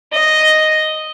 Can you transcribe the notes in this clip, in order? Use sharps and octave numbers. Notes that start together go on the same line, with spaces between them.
D#5